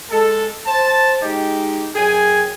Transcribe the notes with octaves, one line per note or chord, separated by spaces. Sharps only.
G#3 A4
C5 A5
G#3 D#4 G4
F#2 G#4 G5 G#5